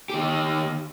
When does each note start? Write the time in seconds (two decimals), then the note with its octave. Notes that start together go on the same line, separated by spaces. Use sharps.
0.10 D#3 G4